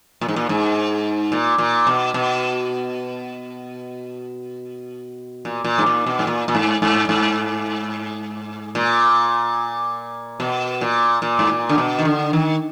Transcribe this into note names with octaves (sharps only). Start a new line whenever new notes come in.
A#2
G#2
A#2
G#2
A#2
A#2
B2
B2
A#2
A#2
G#2
A#2
B2
G#2
A#2
A#2
G#2
G#2
G#2
A#2
B2
A#2
A#2
G#2
A#2
D3
B2
D#3
D3
D#3